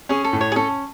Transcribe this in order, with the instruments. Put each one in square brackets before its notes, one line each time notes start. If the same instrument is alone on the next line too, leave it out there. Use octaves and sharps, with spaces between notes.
[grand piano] C#4 [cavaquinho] G#4
[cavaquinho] A4
[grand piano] A2
[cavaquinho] C#5
G#4
[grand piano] C#4 [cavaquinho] A4